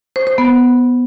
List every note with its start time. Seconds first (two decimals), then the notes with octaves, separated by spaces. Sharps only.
0.16 C5
0.27 C5
0.38 B3